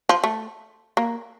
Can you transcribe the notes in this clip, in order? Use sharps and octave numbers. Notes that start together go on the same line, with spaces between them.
F3
A3
A#3